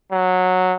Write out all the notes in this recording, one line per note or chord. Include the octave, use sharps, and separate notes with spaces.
F#3